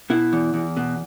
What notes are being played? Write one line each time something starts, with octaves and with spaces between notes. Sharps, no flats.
B2 E4
E2
E2
B2